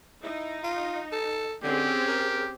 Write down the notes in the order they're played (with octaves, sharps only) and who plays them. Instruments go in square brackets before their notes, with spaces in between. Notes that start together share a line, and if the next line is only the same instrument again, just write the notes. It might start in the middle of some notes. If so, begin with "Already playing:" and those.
[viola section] D#4 [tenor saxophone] E4
[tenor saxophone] F4
A4
[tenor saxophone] D3 [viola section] C4 C#4 G#4 [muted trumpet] G4
[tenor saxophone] A#4